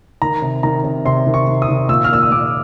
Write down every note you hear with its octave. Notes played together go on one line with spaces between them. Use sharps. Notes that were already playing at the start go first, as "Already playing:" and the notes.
D#3 A#5
C3
D#3 A#5
C3
C3 C6
D#3
C#6
D#3
D#6
D#3
A#2 E6
F6
A#2 E6
D#6
A#2 D6